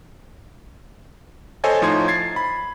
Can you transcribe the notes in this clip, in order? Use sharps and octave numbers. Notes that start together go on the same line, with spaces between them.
A4 C5 C#5 D#5 G#5 G#6
A2 F3 D#4 C6 G#6
G#6 A6 C7
B5